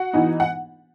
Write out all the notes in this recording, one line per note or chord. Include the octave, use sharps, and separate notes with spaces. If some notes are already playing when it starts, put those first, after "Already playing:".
Already playing: F#4 F#5
E3 B3 D#4
F#5